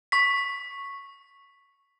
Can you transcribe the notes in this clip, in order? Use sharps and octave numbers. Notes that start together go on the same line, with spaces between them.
C#6 B6